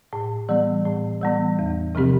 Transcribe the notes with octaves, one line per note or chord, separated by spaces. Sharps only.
A2
E3 G3 B3
A2
E3 G3 B3
E2
C3 F3 C4 G4